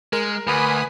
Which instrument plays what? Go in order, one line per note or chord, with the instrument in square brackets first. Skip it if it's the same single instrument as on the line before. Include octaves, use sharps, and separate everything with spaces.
[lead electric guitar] G#3 [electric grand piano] A#4
[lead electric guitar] D2 [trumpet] B4 [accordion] G#5 B5 D#6